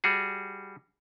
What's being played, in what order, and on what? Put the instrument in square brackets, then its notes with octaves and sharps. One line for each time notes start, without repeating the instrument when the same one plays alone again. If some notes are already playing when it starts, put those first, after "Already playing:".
[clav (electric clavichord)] G3 F#4 G#4